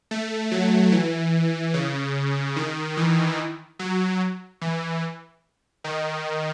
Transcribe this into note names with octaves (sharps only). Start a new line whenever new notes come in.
A3
F#3
E3
C#3
D#3
E3
F#3
E3
D#3